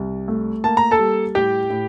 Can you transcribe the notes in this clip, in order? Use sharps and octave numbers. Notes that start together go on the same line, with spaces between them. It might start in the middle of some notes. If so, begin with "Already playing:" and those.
Already playing: C2
A3
A#3 A5
A#5
A4 A5
G3
A2 G4 G5
A2